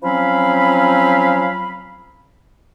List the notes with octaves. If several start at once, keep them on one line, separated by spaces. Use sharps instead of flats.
F3 F#3 C4 C#4 F5 B5